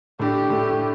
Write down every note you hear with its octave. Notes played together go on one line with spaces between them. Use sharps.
A2 A3 D4 G4
A2 A3 D4